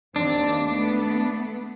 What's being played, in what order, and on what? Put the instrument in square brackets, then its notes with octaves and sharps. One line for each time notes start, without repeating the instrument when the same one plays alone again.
[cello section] D#2 C4 [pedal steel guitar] D4
[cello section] A3 B3